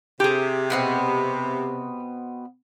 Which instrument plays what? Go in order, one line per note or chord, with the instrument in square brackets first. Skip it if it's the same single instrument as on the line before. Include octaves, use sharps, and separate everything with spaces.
[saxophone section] C3 [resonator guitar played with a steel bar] G4 G#4
[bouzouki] B2 B3 C4